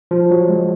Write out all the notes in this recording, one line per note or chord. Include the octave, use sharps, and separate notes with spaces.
F3
F#3
G#3